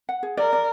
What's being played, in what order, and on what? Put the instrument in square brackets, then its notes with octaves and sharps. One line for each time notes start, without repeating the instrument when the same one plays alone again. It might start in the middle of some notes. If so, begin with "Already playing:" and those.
[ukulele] F#5
G#4
[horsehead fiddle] A#4 [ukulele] D5
[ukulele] D5